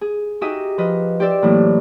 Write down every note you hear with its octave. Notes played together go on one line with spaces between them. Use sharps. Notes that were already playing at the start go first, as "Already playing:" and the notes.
G#4
D#4 F#4 G4 E5 G#5 D#6
F3 B4 D#5
G4 C5 D5 E6
A2 E3 F#3 A#3